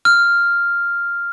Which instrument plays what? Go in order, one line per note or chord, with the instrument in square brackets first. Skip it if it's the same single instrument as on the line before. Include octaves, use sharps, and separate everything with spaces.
[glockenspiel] F6